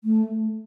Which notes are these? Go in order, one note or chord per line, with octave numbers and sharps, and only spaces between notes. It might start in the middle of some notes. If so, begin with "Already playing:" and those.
A3